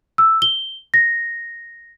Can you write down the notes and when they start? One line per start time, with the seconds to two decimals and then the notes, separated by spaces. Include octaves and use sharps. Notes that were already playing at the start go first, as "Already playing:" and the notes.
0.18 E6
0.42 G7
0.94 A#6